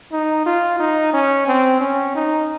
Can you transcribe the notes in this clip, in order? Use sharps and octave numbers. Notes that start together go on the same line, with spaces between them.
D#4
F4
D#4
C#4
C4
C#4
D#4